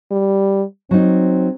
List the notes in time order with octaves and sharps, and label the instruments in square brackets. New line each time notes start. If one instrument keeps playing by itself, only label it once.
[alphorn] G3
[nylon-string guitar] F#3 D#4 [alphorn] C4